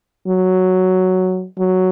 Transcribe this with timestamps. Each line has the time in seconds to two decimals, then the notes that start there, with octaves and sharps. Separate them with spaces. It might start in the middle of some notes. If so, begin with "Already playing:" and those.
0.28 F#3
1.58 F#3